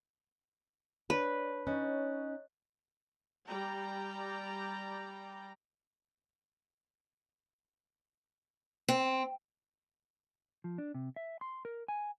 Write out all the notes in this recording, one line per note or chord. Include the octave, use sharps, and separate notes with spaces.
D4 B4 C#5
C#4 D#4 C#5 D#5 F#6
G3 D5 G5 A#5
C4
F3
D4
C3
E5
C6
A#4
G#5